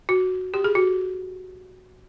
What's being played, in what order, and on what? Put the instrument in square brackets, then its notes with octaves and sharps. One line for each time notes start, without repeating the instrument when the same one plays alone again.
[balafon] F#4
G4
G#4
F#4